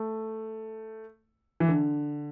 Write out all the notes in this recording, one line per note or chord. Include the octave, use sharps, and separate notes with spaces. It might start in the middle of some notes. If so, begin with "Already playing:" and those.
Already playing: A3
E3
D3